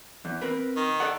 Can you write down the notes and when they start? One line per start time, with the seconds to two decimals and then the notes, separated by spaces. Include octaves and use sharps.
0.25 E2
0.42 C4 A#4 B4
0.76 D#3
1.00 A4 D5 F#5